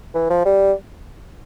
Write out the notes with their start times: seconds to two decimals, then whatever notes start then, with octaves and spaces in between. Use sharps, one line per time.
0.14 E3
0.30 F3
0.45 G3